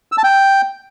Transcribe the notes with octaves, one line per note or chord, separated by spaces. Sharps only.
E6
A5
G5